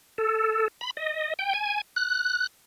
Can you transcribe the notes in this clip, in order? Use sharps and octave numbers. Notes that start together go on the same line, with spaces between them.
A4
B5
D#5
G5
G#5
F#6